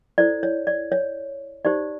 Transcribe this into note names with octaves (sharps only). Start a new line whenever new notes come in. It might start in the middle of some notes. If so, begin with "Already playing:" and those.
E4 A4 C5 D5
C#5
D5
C#5
D#4 G4 C5 D5